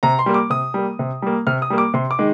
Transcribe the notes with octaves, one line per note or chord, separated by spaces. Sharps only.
C3 A#5
C6
G3 A#3
D6
C3 D#6
G3 A#3
C3
G3 A#3
C3 F6
D#6
G3 A#3
D6
C3 C6
D6
D#3 G#3